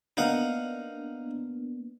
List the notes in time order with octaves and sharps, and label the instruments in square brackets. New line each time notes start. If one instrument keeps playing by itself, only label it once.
[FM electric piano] A#3 B3 D4 [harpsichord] D#4 F5 F#5